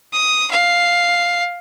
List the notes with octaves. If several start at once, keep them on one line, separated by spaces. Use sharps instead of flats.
D#6
F5